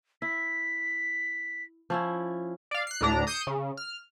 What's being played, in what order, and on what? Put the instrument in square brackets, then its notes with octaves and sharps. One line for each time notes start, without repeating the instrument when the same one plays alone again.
[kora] E4 [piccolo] B6
[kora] F3 C#4 E4
[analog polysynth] D5 F5
F#6 C7
D2 A2 D4 A#5
D#6 G6 C7 C#7 D#7 E7
C#3
F6